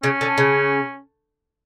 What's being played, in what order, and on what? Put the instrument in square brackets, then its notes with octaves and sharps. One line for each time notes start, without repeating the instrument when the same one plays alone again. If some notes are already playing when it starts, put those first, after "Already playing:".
[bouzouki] C#3 [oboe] C#4
[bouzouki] D3
C#3